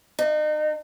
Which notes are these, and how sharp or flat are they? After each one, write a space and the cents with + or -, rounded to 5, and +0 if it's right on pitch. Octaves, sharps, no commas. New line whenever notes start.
D#4 -35